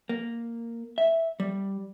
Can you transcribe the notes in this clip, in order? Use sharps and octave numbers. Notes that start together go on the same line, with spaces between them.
A#3
E5
G3